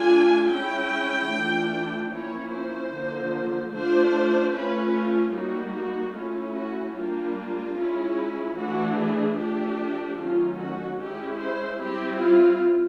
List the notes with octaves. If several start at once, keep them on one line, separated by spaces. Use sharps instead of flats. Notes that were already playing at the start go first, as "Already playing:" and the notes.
Already playing: A3 D4 F4 G#5
G#3 C#4 E4 G5
E3 A3 D4 F4
F3 A#3 C#4 E4 C#5
C5
D3 F3 A#3
A3 D4 F4 C5
A3 C#4 F4 B4
F4
G3 A#3 D#4 F#4
F#4
A3 C#4 E4 F4
F#4
G3 A#3 D4 F4
G#3 C#4 E4
E3 A3 D4 F#4
G#4
F3 A3 D4 G4
D#3 F#3 A3 C#4 F4
F#4
G#3 C#4 E4 G4
C5
G3 C4 E4 G4
F4